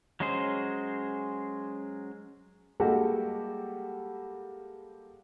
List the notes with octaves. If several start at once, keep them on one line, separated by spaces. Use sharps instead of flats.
F#3 G#3 C#4 G#4 C5
G3 G#3 A#3 F#4 G4 A4